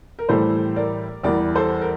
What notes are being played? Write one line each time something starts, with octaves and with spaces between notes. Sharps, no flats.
A#4
A2 E3 G3 A4 C5
A#4 D5
E2 E3 G3 A#4 D5
A4 C5
A#4